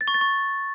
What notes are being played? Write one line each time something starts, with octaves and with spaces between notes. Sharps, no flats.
A6
C#6
A6
C#6